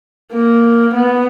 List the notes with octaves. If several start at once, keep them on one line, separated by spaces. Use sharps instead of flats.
A#3
B3